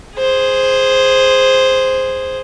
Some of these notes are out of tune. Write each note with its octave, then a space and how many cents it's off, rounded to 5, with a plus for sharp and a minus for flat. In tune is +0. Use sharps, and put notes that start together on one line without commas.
G#4 -5 C5 +0